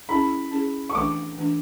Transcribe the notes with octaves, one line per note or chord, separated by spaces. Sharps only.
C#4 E4 G#4 B5
C#4 E4 G#4
C#6
E3 A3 D4 D6
E3 A3 D4